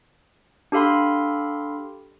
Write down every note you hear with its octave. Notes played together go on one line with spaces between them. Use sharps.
D4 G4 A4 F5 B5 C6